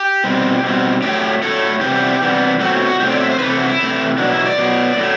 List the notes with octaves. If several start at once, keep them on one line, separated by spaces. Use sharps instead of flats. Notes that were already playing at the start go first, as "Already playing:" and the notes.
Already playing: G4
B2 G3 C4
B2 G3 C4
A2 F#3 A3 G4
A2 F#3 A3 A4
C3 E3 G3 B3 G4
C3 E3 G3 B3
B2 F#3 A3 C4 F#4
F#4
B2 F#3 A3 C4 G4
D5
E5
C5
C3 E3 A3 B4
A4
F#4
E4
C3 E3 A3
B2 F#3 B3 D4
E4
D5
B2 F#3 B3
A2 F#3 A3